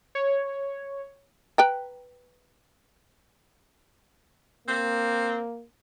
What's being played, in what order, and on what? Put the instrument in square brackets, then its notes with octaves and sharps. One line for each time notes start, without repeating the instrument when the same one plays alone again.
[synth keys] C#5
[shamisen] B4 G5 A#5
[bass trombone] A#3 [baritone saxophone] C4